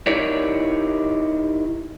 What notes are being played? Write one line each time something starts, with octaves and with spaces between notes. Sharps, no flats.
D#4 E4 G4 A#4 C#5 D5